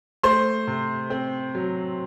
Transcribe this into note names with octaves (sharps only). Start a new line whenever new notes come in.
A3 C5 C6
C3
C4
F#3